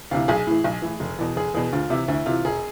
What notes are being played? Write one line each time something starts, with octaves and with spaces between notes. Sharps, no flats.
D2 C3 E3 F5
B1 G#4
A2 E3
B1
A2 E3
F1
E2 B2
F1 G#4
E2 B2 G#4
D2 F4
C3 E3 E4
D2 E4
C3 E3 F4
E1 G#4